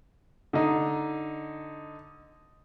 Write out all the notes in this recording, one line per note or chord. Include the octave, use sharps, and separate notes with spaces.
D3 D#4